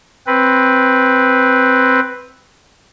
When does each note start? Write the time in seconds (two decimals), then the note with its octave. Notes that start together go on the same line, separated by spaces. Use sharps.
0.27 C4 B4